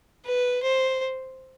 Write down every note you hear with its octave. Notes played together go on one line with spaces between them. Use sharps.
B4
C5